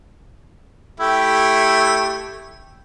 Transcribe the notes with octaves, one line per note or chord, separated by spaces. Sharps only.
A3 E4 G4